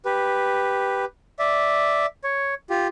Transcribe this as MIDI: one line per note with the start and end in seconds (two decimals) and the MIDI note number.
0.05 1.05 67
0.05 1.05 71
1.39 2.06 74
1.39 2.06 76
2.24 2.54 73
2.70 2.88 65
2.70 2.88 67